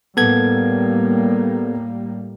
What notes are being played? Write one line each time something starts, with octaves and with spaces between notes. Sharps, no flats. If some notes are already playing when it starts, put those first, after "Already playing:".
A2 G3 A#3 B3 A4 G#6